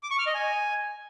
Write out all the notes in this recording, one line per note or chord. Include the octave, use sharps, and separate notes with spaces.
D6
C#6
F6
D#5
G#5